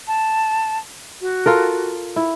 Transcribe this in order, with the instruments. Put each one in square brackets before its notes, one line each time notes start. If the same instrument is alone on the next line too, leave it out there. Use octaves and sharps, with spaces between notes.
[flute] A5
F#4
[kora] F4 A4 A#4
E4